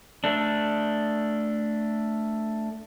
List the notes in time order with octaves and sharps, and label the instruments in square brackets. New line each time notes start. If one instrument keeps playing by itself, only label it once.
[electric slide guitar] A3 D4